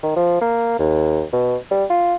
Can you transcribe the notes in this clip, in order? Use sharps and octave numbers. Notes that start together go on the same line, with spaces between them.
D#3
F3
A#3
D#2
B2
G3
F4